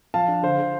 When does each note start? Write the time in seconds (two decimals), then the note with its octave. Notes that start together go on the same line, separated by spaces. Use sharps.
0.14 F3 F5 A5
0.28 D4
0.43 D3 C5 F5
0.58 D3